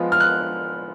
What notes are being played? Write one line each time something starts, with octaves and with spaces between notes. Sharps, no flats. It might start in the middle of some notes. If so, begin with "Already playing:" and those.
Already playing: F3 G#3 B3 F4
F6
F#6